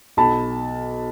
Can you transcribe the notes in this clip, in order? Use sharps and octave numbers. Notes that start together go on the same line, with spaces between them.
B1 A5 B5